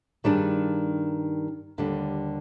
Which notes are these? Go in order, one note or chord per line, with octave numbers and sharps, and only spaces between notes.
G2 D#3 G3 D4 G#4
D#2 D3 G3